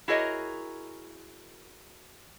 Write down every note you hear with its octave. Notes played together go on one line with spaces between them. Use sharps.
E4 F#4 G#4 A#4 C#5 D#5